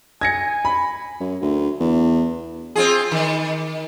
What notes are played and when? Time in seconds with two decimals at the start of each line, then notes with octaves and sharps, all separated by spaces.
0.21 G#5 G#6 A#6 C#7
0.65 B5
1.20 F#2
1.42 D2
1.80 E2
2.75 C4 F4 G#4
3.12 D#3